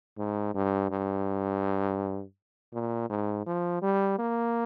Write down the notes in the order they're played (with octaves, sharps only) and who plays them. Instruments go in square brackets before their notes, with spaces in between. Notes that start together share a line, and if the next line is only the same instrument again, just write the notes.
[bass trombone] G#2
G2
G2
A#2
G#2
F3
G3
A#3